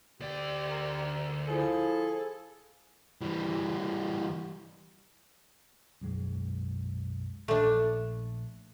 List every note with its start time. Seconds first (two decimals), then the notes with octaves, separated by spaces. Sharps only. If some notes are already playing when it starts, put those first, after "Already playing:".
0.20 D2 G4 D5
0.70 A#4
1.48 F3 E4 G#4 A4
3.21 E3 G3
6.01 B1 F#2 G#3
7.48 A#1 A3 D4